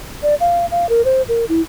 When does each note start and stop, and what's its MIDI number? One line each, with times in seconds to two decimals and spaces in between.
0.23 0.35 74
0.40 0.66 77
0.71 0.89 77
0.89 1.04 70
1.05 1.22 72
1.29 1.45 70
1.49 1.61 64